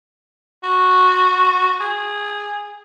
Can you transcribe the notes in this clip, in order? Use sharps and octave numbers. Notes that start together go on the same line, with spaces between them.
F#4
G#4